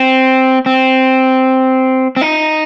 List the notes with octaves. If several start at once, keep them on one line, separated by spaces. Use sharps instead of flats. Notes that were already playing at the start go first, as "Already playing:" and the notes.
Already playing: C4
C4
C4
D#4